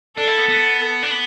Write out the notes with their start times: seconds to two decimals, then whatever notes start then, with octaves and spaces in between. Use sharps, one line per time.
0.17 D4 A4
0.27 E4
0.38 B3
0.48 B3
1.03 D4
1.11 B3